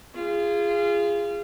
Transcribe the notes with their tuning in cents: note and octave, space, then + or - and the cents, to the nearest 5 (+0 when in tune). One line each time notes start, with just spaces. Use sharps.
F4 -25 G#4 -15